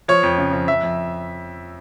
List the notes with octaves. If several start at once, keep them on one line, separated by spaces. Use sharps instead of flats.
F3 C#5
F2
C#3
F2
F2 E5
F2